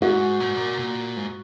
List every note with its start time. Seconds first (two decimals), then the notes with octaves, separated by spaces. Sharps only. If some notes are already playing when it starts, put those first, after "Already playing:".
0.02 G#2 F#4
0.40 A#2
0.48 G#2
0.57 A#2
0.79 A#2
1.17 G#2